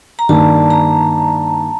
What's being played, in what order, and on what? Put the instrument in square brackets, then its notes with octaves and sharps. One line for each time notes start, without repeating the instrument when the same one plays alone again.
[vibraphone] A#5
[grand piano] G2 D#3 A#3 D4 [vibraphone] A5
[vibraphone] A#5